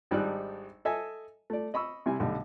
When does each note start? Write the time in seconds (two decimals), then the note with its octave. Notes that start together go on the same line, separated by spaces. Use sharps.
0.11 G#1 G3 D4 D#4 D5 F#6
0.85 A4 D#5 E5 G#5
1.50 A3 D5
1.74 D#5 B5 C#6 E6
2.06 C3 G3 E4 G#5
2.20 B1 D3 G3 A3